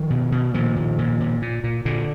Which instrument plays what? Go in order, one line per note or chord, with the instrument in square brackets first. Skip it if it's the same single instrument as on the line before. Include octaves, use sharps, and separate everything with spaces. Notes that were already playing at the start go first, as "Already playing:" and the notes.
Already playing: [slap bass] D#3 F3
B2
B2
A#2 D#3 F3
A#2
A#2
A#2
A#2
A#2
A#2 D3